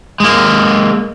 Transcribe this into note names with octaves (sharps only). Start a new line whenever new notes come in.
G#3 A#3